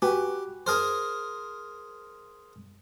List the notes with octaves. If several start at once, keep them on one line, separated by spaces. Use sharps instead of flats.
F#4 G4 B4 G#5
G#4 A#4 C5